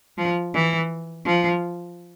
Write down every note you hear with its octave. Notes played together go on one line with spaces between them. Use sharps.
F3
E3
F3